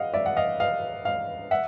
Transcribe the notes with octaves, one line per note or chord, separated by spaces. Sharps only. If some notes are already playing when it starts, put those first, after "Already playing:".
Already playing: D#5 F5 F#5
D5 E5
F#5
D#5 F5
D#5 F5
D#5 F5
E5 F#5